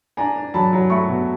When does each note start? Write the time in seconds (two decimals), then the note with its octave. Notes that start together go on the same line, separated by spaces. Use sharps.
0.17 D4 G#5 A#5
0.36 D4
0.54 F#3 A5 B5
0.73 F#3
0.90 A3 B5 C#6
1.08 B2